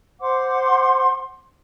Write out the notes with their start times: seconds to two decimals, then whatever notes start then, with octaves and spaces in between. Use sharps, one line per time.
0.20 C5 F#5 C6 D6